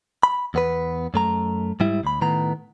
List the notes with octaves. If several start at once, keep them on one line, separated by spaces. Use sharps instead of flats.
B5
E2 B3 B4
F#2 A3 A#5
G#2 G3 E4
D2 B5
A2 D#3 B3 A#5